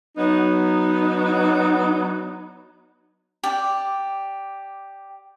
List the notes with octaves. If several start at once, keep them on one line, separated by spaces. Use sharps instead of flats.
F#3 B3 D#4
G4 D5